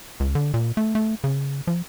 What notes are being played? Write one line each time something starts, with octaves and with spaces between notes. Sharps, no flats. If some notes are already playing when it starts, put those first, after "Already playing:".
C#2
D3
A#2
A3
A3
C#3
F3